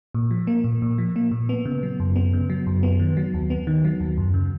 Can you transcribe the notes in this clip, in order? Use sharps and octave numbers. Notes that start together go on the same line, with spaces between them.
A#2
F3
A#3
A#2
A#2
F3
A#3
A#2
B3
C#3
F#3
F#2
B3
C#3
F#3
F#2
B3
D#3
F#3
D#2
B3
D#3
F#3
D#2
F#2
C#3